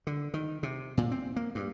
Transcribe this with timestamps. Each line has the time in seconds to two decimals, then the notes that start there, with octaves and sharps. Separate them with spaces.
0.07 D3
0.34 D#3
0.63 C3
0.97 A#2
1.11 C4
1.36 A#3
1.55 G2